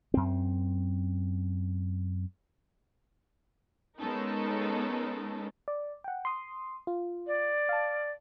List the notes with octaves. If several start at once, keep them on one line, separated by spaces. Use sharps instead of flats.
F#2 C4
G#3 B3 C#4 D#4 A4 A#4
D5
F#5 G5
C6 D#6
F4
D5
F5 A5